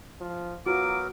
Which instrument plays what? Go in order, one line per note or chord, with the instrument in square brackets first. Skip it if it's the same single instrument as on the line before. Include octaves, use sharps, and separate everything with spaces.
[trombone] F3
[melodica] F#3 B3 A#4 [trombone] F4 [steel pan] F#4 [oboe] D6